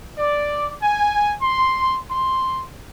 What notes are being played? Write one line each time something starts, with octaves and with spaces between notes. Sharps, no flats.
D5
G#5
C6
C6